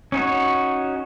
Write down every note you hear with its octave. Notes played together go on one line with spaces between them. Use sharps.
C#4 D#4 F#4 C#5